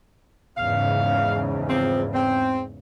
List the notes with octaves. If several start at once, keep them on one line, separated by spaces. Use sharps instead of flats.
E2 G#2 C#3 F5
F3 C4
C4